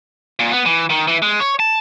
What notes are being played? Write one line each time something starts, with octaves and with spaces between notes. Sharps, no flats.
A#2
B3
E3
D#3
E3
G#3
C#5
A5